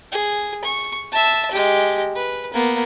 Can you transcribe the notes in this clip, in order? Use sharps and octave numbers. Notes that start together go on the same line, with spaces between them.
G#4
C#6
E5 A5
G#3 G4
B4
A#3 B3